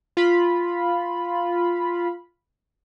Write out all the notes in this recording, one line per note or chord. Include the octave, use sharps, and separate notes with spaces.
F4 B5